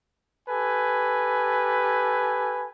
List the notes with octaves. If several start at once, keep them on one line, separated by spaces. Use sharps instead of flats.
G4 A4 B4 G#5